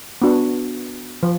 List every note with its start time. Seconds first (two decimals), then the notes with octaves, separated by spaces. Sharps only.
0.22 B3 D4 F#4
1.23 F3